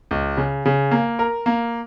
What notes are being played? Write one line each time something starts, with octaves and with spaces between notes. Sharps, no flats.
C#2
C#3
C#3
A#3
A#4
A#3